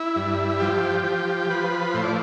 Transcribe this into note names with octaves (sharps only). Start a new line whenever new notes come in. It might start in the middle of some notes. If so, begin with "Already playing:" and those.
Already playing: E4
G2
F3 G4
F3
F3 B4
A2 C5
D5